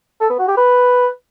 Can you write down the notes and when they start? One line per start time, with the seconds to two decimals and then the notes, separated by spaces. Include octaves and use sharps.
0.21 A4
0.30 B3
0.39 F#4
0.48 G4
0.57 B4